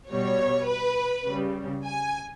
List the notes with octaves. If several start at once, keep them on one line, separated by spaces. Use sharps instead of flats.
B2 G3 C#5
B4
C#3 G3
G#5